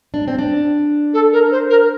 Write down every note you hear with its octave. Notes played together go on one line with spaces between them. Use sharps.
D4
C4
D4
A4
A#4
C5
A#4